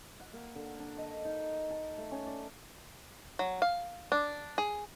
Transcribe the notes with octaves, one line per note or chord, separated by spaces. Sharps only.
F#5
A#3
D3
D4
D#5
D#4
A4
A3
C#4
D5
F#3
F5
D4
G#4